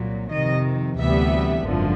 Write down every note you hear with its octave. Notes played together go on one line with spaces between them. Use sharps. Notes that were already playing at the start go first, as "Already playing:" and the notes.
Already playing: C2 A#2 F#3
F2 C3 D#3 D#5
D2 C3 E3 G3 B3 E5
G#1 F#2 D3 F3